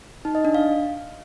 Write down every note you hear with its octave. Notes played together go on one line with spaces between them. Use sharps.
D#4
D#5
D4
F5